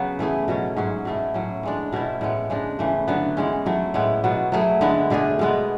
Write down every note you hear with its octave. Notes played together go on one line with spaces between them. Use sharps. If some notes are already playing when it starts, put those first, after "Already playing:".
Already playing: C#3 F#3 B3
E3 A3 E4 G#4
B2 F#3 C#4
G#2 F#3 C#4
B2 A3 E4 G#4
A2 F#3 C#4
E3 G#3 D4
B2 A3 C#4 E4
A2 G#3 B3
C#3 G#3 D4
C#3 E3 A3
D3 F#3 B3
E3 G#3 C#4
F#3 A3 E4
A2 G#3 B3 E4
B2 F#3 B3
F#3 A3 E4 G#4
D3 G#3 B3 E4
B2 A3 D4 G#4
B2 G#3 B3